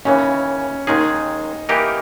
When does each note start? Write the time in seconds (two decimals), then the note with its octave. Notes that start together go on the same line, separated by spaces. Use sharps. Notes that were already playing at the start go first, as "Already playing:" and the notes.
0.05 D#2 C#3 E3 C#4
0.87 D#2 D#3 G#3 C#4 D#4 G#4
1.69 E3 A#3 D#4 G4 A#4